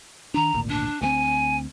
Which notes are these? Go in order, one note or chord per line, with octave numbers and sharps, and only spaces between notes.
D#3 D4 A#5
G#1 D2 A#2
D4
D2 A3 C4 G#5